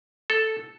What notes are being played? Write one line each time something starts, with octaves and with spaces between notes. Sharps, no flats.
A4